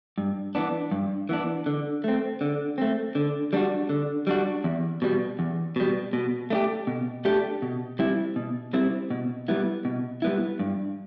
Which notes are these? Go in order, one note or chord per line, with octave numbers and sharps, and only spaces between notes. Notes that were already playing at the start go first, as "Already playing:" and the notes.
G2
E3 B3 D4
G2
E3 B3 D4
D3
A3 C4
D3
A3 C4
D3
G3 D4 F#4
D3
G3 D4 F#4
E2
B2 G3
E2
B2 G3
B2
A3 D4 G4
B2
A3 D4 G4
B2
G3 C4 E4
B2
G3 C4 E4
B2
G3 B3 E4
B2
G3 B3 E4
G2